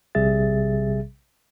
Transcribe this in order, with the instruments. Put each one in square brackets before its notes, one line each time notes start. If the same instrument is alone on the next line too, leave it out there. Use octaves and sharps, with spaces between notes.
[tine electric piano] A#1 C3 G3 G#4 E5 A6